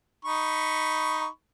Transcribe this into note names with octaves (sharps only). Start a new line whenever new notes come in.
D#4 B5 C#6